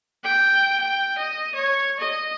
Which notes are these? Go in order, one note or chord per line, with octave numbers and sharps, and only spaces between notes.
G5
G5
D#5
C#5
D#5